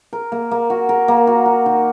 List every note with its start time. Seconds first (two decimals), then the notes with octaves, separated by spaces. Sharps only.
0.13 A#4
0.32 A#3
0.51 A#3
0.70 F#4
0.89 A#4
1.08 A#3
1.27 F#4
1.46 F#4
1.66 D#3